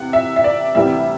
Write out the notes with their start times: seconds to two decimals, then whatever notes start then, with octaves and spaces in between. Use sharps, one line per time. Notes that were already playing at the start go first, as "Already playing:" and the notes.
Already playing: E2 C3 F#5
0.13 E5
0.36 E5
0.44 D5
0.75 D2 C3 E3 G3 E5